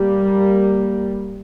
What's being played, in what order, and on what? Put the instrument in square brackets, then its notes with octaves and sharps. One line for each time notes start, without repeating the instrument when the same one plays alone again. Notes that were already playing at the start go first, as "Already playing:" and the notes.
Already playing: [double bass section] G3 A#3